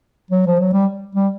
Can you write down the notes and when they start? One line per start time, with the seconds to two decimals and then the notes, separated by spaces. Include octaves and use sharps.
0.31 F#3
0.47 F3
0.60 F#3
0.73 G3
1.15 G3